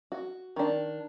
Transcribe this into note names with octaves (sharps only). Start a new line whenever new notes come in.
F#4
D#3 D4